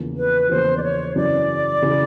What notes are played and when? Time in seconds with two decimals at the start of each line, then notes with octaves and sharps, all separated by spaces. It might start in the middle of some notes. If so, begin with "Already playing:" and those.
Already playing: E2 C#3 F3 A#3
0.17 B4
0.49 E2 C#3 F3 A#3 C5
0.77 D5
0.82 C#5
1.15 F#2 C#3 E3 D5
1.82 C#3 E3